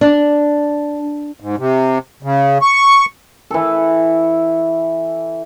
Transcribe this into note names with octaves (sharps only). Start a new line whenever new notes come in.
D4
G#2
C3
C#3
C#6
E3 A4